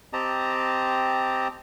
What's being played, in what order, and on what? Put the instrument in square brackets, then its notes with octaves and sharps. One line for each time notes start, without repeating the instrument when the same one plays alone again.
[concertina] C4 G4 D#5 A5 A#5